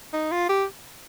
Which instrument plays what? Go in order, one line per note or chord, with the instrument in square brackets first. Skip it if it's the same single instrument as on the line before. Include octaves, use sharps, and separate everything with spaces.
[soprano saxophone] D#4
F4
G4